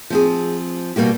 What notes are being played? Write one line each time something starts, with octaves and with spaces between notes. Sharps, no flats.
F3 C4 G#4
B2 G3 A#3 F#4 G4